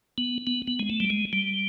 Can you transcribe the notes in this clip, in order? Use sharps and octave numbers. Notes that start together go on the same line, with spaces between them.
B3
B3
B3
G#3
A3
G3
G#3
G3